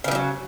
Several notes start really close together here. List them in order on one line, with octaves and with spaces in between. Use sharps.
C#3 E3 G3 F#3